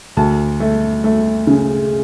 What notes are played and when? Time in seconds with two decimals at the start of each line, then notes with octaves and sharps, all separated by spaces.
0.17 D2 A5
0.60 A3
1.04 A3
1.47 C#3